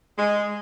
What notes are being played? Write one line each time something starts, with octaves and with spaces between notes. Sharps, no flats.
G#3